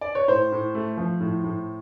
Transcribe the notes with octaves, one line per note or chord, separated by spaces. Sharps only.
D5
C#5
A2 C5
A2
A3
F3
A2
A2